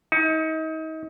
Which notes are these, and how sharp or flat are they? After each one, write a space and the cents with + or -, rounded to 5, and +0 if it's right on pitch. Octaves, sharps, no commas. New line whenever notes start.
D#4 +35